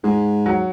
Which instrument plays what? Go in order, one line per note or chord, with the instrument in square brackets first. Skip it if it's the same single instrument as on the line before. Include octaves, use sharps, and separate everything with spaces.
[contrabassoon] G#2 [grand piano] G#3
[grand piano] F#3